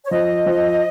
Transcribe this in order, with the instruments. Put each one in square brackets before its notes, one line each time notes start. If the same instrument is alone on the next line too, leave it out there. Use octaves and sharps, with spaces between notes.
[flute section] C#5
[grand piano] F3 [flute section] D#5
[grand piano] F3